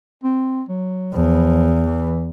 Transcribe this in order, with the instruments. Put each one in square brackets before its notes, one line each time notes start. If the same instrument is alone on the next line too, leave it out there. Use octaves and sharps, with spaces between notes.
[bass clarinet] C4
F#3
[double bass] E2 [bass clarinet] F3
[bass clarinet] E3